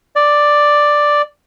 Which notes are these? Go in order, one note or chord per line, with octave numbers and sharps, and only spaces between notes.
D5